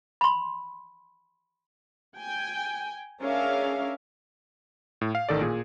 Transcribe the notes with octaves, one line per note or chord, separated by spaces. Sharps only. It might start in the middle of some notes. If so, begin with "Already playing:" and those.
B5 C6
G5 G#5
C#4 D4 G#4 A#4 E5 F5
A2
F5
A1 D#3 A4 D5
A#2 G#4